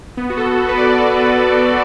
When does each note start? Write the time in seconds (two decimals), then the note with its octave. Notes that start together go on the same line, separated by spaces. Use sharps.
0.17 B3
0.30 F#4
0.37 A4
0.58 F#4
0.69 B4
0.77 D5
0.98 D5
1.24 B4